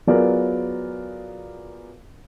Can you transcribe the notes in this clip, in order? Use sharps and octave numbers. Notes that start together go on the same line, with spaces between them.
F#3 B3 F4 G#4 A#4 D5